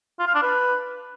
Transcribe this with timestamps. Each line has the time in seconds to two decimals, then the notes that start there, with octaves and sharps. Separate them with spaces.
0.19 F4
0.27 F5
0.35 D4
0.42 B4